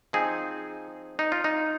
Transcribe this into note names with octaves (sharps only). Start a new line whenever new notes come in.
F3 C4 D#4 G#4
D#4
F4
D#4